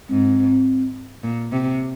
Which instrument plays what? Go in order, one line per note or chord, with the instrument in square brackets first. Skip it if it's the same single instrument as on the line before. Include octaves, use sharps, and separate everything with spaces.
[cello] G#2 [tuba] C4
[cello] A#2
C3